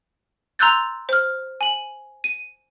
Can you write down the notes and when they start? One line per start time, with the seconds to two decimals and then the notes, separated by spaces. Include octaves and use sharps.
0.59 A#5 C6 E6 F#6 G6 A6
1.09 C5 F6
1.61 G#5 F#7
2.24 D#7